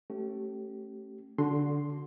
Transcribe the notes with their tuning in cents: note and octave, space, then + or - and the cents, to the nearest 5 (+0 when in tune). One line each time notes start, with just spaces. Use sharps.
A3 +0 C#4 -25 G4 -30
D3 -15 F#4 +0 C6 +0